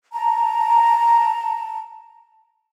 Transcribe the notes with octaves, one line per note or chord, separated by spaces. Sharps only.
A5 A#5